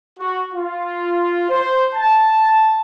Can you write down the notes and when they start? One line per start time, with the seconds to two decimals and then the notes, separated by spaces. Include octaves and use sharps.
0.19 F#4
0.54 F4
1.50 C5
1.95 A5